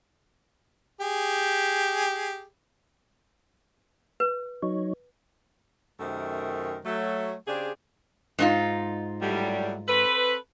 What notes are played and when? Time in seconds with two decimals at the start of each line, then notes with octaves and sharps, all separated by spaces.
1.01 G4 G#4
4.20 B4
4.62 F#3 D#4 C#5
5.99 F#2 C3 D#3 A3 A#4
6.85 F#3 A3
7.48 C#3 C4 D4 G4 G#4
8.39 G#2 D#4 F4
9.21 A2 F#3 G3
9.88 C4 A4 B4